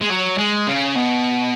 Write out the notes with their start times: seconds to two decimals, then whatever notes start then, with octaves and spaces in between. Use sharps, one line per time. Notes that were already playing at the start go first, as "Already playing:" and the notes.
0.01 G#3
0.10 F#3
0.38 G#3
0.67 C#3
0.95 B2